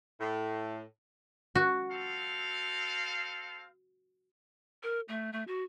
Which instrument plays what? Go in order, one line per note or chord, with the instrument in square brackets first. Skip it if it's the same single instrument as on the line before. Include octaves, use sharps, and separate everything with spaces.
[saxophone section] A2
[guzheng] F#4
[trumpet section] C4 A4 F5
[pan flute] A#4
A3
A3
F#4